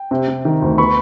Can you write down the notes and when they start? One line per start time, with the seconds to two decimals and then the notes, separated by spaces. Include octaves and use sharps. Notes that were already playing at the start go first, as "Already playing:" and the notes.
Already playing: G5
0.11 C3
0.28 C3
0.45 D#3
0.62 D2
0.78 B3 B5 C#6